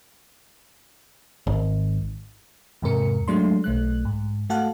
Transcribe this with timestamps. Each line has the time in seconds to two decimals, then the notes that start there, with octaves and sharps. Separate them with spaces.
1.47 G#1
2.82 E2 G#2 C3 A#4 C#7
3.28 F#3 G#3 A3 D4 C6
3.64 B1 A3 F#6
4.05 G#2
4.50 A3 F#4 F5 F#5 A5 F#6